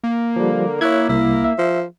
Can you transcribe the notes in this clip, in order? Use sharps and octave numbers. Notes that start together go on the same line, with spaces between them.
A#3
D3 F3 G3
E4 C#5 F#6 G#6
C2 E4
E5
F3